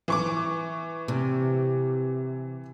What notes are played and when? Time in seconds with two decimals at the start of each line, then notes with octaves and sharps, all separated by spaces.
0.08 E3 C#6 D6
1.08 C3